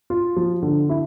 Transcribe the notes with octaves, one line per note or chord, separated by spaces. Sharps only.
F4
F3
D3
E4